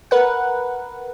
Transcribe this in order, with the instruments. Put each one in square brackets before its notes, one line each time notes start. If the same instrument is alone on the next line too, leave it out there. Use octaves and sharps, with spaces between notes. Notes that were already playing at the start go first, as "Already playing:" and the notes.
[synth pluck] A#4 B4 F#5